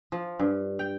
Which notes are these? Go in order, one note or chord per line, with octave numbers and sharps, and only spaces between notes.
F3
G2
G5